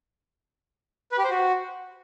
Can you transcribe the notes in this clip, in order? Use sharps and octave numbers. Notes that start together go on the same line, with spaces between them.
B4
G4
C5
F#4